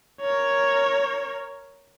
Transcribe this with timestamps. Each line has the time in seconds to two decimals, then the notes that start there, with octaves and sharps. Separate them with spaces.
0.21 A#4 C#5